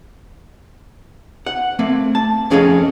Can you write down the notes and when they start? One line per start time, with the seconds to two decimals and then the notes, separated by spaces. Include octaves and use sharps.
1.46 F#5
1.79 A3 A#3 C4
2.15 A5
2.51 F2 C#4 G#4 A4 D#5 F5